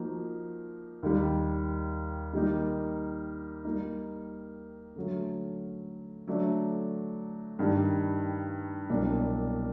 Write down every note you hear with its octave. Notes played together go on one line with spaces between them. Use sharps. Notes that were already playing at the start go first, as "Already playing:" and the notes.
Already playing: F3 A#3 D#4 F#4
D#2 D#3 G3
D#3 G3 A#3 D#4
G3 A#3 D#4
D3 F#3 A3
D3 F#3 A3 D4
G2 D#3 G3
C2 B2 F#3 A#3 D4